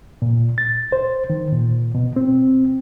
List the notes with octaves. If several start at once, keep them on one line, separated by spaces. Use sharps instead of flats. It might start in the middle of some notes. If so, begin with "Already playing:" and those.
A#2
A6
C5
D#3
A#2
B2
C4